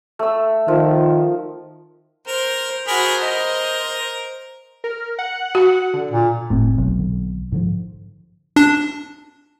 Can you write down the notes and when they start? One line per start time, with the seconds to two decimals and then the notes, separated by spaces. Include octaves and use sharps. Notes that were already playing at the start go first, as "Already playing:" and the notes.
0.19 A3 E6
0.68 D#3 F3
2.27 A#4 C5
2.87 F#4 G#4 A#4 C5 B5
3.21 A#4 D#5
4.84 A#4
5.19 F#5
5.55 F#4
5.93 D3
6.11 A#2
6.50 F#1 A2 C4
6.78 B1
6.99 D3
7.52 G#2 D3 F3
8.56 D4